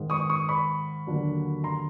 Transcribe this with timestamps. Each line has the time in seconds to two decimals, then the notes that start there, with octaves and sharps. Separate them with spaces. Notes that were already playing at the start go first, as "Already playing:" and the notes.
Already playing: G#2 D#3 G#3
0.10 C#6 D#6
0.30 C#6 D#6
0.49 B5 C#6
1.07 D#2 D3 F#3 A#3 D4
1.64 A#5 C6